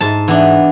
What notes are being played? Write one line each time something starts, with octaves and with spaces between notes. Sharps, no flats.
G#2 A5
E3 B3 D4